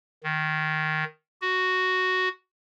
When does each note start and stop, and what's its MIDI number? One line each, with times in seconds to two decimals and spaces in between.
0.23 1.04 51
1.41 2.29 66